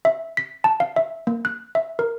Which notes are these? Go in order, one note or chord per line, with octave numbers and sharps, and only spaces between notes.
E5
B6
A5
F5
E5
A#3
F#6
E5
A#4